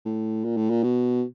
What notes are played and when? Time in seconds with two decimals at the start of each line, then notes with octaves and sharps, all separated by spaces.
0.06 A2
0.45 A#2
0.57 A2
0.70 A#2
0.84 B2